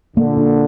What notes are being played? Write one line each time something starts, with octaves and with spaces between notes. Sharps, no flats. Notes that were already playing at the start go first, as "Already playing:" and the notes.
A#2 D3 A#3
D4